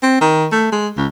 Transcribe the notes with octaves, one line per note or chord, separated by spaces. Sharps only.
C4
D#3
A3
G#3
C#2